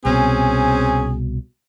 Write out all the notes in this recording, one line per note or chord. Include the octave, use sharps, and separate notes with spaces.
C2 B2 C4 C#4 G#4